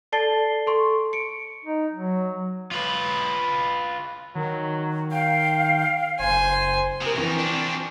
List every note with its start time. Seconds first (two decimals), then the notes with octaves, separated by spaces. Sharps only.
0.12 A4 D5 A5 A6 C7 G7
0.67 A4 C6 C#6
1.13 C#7 D7
1.65 D#4
1.93 F#3
2.71 F4 B4
4.36 D#3 F#3
5.12 F5 G5
6.20 F#1 C5 G#5
7.02 C3 A#4 D#6
7.17 E3 F3 C4 A#4 C#6
7.39 F3 D4